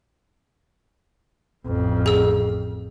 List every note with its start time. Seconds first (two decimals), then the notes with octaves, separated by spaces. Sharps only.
1.66 A1 F2
2.06 G#4 E6